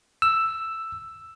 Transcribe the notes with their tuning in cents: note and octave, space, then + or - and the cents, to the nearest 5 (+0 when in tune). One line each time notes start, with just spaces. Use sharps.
E6 +5